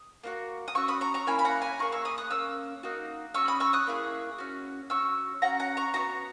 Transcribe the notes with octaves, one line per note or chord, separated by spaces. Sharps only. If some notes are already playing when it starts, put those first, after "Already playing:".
Already playing: D#6
A#3 D#4 F#4
D#6
C#4 F#4 C#6 E6
B5 D#6
A#5 C#6
A#5 C#6
A#3 C#4 E4 G#5 B5
B5
F#5 A#5
G#5 B5
A#3 E4 G#4 A#5 C#6
C#6 E6
B5 D#6
D#6 F#6
A#3 C#4 E6
A#3 D#4 F#4
C#4 F#4 C#6 E6
B5 D#6
C#6 E6
D#6 F#6
A#3 E4 G#4
C#4 F#4
C#4 F#4 C#6 E6
C#4 F#4 F#5 A#5
F#5 A#5
A#5 C#6
B3 D#4 F#4 A#5 C#6